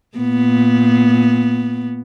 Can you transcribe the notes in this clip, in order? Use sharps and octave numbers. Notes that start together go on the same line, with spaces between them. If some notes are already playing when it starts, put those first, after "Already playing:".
A#2 B3